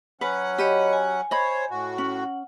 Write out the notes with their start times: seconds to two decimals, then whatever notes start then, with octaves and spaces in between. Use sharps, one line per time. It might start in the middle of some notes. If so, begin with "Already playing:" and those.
0.21 F#3 C#4 B4 F#5
0.58 G4 C#5 D#5 B5
0.93 G#5
1.31 C5 C#5 D#5 B5
1.70 A2 F#4
1.98 C#4 F#5